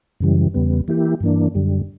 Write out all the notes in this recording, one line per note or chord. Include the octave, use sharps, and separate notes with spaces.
F#2 C#3 E3 G3
E2 C#3 G3 B3
E3 A#3 E4 G4
G2 E3 A#3 D4
F#2 D3 G3